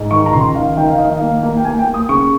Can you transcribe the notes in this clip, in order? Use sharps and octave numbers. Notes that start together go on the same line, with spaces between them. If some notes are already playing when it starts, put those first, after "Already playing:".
Already playing: G#2
D#3 C#6
A#5
C#2 C6
D#3 F5
D#3 G5
F5
D#3 D#5
F5
A#3
A#3
G5
A#3 G#5
G5
A#3
D#6
C#3 C#6